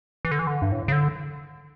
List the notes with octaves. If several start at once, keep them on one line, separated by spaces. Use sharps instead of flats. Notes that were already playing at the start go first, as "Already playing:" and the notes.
E3
D3
E3
D3
G2
A2
C#3
D3